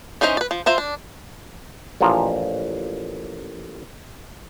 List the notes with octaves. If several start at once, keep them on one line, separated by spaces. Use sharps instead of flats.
E3 C#4 D#4 C5 D#5
B4 D5
F3
F4 C5 E5 A#5
D4
A1 A#2 F3 A#5